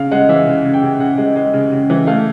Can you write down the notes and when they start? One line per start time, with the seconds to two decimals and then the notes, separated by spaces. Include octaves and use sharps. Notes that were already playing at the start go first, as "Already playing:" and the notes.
Already playing: C#3 F5
0.11 G#3 F#5
0.29 E3 E5
0.47 C#3
0.65 C#3
0.74 G5
0.82 C#3
1.00 C#3 F#5
1.18 G#3
1.36 G#3
1.53 C#3
1.72 C#3
1.90 E3
2.07 A3 F5